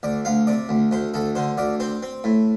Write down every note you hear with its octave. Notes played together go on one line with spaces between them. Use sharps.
D2 D5
D2 F5
C3 D5
D2
D2 C5
D2 A4
D3 C5
D2 D5
C4 C5
C4
A2